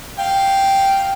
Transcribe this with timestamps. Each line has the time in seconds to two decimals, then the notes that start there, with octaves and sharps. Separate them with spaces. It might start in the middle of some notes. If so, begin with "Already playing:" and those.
0.19 F5 G5